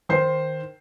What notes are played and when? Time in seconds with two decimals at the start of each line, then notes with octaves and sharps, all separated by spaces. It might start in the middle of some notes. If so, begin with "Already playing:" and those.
0.09 D#3 C5 C7